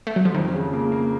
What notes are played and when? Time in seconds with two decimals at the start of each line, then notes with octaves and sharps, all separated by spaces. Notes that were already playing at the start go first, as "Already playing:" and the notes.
0.07 A3
0.16 F#3
0.25 F3
0.35 F2 D#3
0.53 C#3
0.73 A#3
0.92 A#3